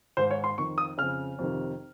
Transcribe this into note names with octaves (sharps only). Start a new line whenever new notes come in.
G#2 D#3 C5
C#5
C6
F2 D#3 C#6
D#6
F2 C#3 F6
F2 C3 D#3